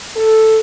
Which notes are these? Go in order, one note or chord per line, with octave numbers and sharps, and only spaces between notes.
A4